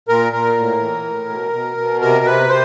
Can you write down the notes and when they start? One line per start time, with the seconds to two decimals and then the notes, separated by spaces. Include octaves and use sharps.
0.09 A#2 A#4
0.33 A#2 A#4
0.57 A2
0.81 E3
1.05 A2
1.30 B2
1.53 B2
1.77 B2
2.01 C3 A#4
2.25 C3 B4
2.49 C3 C5